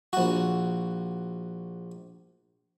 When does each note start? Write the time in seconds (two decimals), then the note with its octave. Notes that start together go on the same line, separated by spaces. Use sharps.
0.13 A#1 F#4